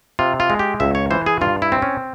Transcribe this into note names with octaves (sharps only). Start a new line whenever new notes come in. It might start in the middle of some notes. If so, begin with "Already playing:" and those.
C3 F4
F4
G#3
G4
C#2 E5
C#5
E3 C5
G#4
G2 F4
E4
C4
C#4